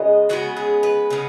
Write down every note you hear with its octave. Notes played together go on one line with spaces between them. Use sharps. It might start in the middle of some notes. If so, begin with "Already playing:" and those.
Already playing: C#3 G#3 B3 D#5
C#3 G#3 B3 F#4
G#4
B4
C#3 G#3 B3